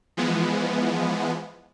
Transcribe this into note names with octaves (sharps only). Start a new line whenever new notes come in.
E3 F3 G#3 B3